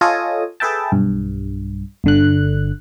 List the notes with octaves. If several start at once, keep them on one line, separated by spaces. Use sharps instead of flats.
F4 A4 C#5 D#5 G#5 D#6
G#4 A4 B4 E5 G5 A5
B1 G2
G1 D3 F#6